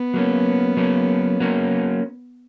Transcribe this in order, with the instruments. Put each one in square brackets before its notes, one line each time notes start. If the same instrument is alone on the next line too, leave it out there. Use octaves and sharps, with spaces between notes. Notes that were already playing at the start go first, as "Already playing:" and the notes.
Already playing: [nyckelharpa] B3
[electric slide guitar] F#3 A#3 C#4
F#3 A#3 C#4
F#3 A#3 C#4